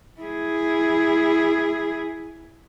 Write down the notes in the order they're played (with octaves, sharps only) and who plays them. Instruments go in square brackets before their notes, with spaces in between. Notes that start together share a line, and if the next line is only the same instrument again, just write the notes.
[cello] E4 G#4